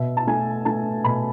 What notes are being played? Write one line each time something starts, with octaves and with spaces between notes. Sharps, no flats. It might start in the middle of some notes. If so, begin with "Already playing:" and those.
Already playing: B2 E5
A5
A3 G#5
A3 A5
B2 B5